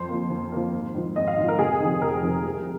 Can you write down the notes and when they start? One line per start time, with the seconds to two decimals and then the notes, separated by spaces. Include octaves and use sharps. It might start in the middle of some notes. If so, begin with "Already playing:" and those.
Already playing: F2 C5
0.09 F3 A#3
0.30 F2
0.52 F3 A#3
0.73 G#1
0.95 G#2 F3
1.16 G#1 D#5
1.27 F5
1.37 G#2 F3
1.48 A#4
1.59 F1 G#4
1.80 D#3
1.85 F2
2.01 F1 A#4
2.23 F2 D#3
2.44 C2